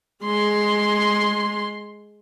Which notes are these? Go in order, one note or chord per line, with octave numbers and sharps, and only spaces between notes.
G#3 C6